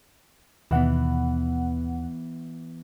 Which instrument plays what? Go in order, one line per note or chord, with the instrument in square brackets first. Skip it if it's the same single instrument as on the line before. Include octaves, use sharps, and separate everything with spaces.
[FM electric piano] D#2 B2 F#5 [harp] E3 B3